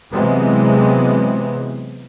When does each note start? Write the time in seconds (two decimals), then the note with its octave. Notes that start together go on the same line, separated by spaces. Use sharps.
0.12 C3 E3 F#3 G#3 B3 C4